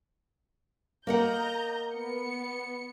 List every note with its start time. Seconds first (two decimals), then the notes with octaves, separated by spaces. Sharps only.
1.07 A#3 A#4 D#5 F#5 A#5 G6
1.93 B3 C#7